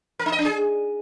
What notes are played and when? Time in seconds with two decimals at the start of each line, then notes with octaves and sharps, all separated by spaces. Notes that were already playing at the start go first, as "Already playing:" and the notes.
0.19 A#4
0.26 D#4
0.32 D#5
0.39 D4
0.45 G#4